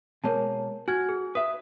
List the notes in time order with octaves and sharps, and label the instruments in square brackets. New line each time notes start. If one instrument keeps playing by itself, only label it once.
[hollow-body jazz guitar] B2 G#3 A#3 [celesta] A#4 C#5 A5
[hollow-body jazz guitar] F#4 [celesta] G#5 F6 G#6
[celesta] G#4
[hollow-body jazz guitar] B4 E5 [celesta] D#6